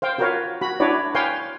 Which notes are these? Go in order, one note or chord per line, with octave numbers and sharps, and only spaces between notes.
C5 F5 G5
F4 F#4 A#4 B4 C#5 F5
F#4 B5
D4 E4 F#4 B4 C#5 D5
B4 C#5 F5 G5 G#5 C6